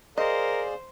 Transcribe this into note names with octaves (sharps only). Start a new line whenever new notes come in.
G#4 A#4 C5 D5 D#5 F5